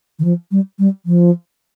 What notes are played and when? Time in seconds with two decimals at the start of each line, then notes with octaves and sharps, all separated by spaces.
0.19 D#3
0.24 F3
0.51 G3
0.79 G3
1.06 F3